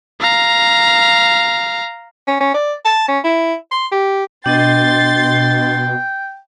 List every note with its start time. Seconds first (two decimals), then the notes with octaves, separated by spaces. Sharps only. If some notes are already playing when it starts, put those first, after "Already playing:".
0.21 F5 A#5
2.27 C#4
2.40 C#4
2.54 D5
2.85 A5
3.08 C#4
3.24 E4
3.72 C6
3.92 G4
4.46 B2 D4 D#5 G5 C6 A6